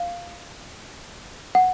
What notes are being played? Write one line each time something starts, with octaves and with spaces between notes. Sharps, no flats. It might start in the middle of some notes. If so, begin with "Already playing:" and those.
Already playing: F5
F#5